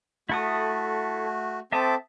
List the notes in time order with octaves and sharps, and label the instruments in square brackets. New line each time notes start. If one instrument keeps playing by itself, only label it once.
[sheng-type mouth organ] A3 F#4 [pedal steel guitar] E4 A4 D#6
[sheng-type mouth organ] C4 A4 D6 [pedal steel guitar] E5 A5 D#6